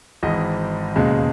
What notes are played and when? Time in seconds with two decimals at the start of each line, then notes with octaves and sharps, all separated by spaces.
0.23 G#1 G#2 E3 D#5
0.95 E1 D#2 C#3 G#3